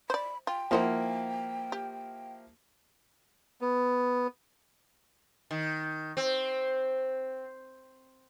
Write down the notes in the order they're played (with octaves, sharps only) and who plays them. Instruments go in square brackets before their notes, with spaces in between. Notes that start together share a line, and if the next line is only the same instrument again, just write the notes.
[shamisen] C5 D5 [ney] B5
[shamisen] F4 [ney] G5
[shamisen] D#3 C5 F#5 [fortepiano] F3 A#3 E4
[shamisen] G4
[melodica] B3
[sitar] D#3
C4